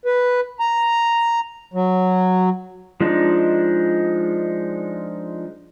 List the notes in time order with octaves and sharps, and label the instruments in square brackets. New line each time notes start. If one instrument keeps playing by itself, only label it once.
[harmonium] B4
A#5
F#3
[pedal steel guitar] F3 G#3 D4 D#4